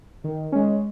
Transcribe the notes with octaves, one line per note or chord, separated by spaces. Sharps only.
D#3
G#3 C#4